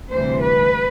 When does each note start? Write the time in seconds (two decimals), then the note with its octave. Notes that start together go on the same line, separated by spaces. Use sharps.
0.11 D2 C3 E3 G3 C5
0.41 B4